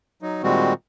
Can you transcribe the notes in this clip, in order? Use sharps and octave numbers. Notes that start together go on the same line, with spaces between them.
F#3 D#4
A#2 D#3 G3 G#3 C4 F#4